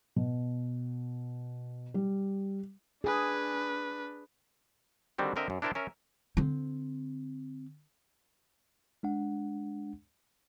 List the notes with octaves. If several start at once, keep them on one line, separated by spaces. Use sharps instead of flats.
B2
G3
D4 G#4 B4
D3 D#3 G3 C4 F#4
D3 C4 A#4 D#5 E5
F#2
D4 E4 A#4 C5 G5 A5
C#4 A#4 E5
D3 C4
G#3 D4 F#5